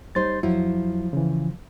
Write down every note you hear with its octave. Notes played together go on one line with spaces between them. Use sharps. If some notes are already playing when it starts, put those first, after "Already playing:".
G3 D#4 C5 C6 A6
F2 F3 F#3 E4
C#3 E3